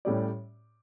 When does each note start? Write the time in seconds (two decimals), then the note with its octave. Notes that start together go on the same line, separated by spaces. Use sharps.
0.05 A2 G3 C#4 G4 D5